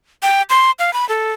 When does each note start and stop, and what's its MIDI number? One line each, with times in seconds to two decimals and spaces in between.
0.23 0.42 79
0.50 0.71 84
0.79 0.93 77
0.93 1.08 83
1.09 1.32 69